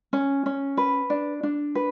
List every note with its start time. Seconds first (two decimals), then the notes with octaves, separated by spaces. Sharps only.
0.13 C#4
0.46 C#4
0.77 B4
1.10 D4
1.43 D4
1.75 B4